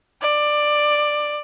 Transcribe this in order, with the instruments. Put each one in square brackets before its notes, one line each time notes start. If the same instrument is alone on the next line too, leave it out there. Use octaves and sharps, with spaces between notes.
[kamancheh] D5